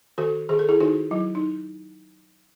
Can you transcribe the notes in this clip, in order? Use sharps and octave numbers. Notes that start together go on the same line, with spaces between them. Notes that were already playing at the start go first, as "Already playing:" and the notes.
D#3 F#4 A4
D#3 G#4
A4
E4 G#4
D#3 D#4 F#4
F#3 E4
D#4